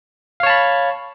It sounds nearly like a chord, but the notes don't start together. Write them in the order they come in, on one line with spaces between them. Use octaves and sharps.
F5 C#5 A5 B5